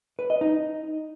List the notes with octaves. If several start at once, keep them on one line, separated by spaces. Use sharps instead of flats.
B4
D#5
D#4